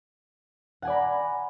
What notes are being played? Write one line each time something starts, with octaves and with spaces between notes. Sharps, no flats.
D5 F#5 G#5 A#5 B5